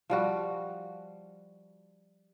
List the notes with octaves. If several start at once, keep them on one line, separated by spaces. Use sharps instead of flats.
F3 G3 F#4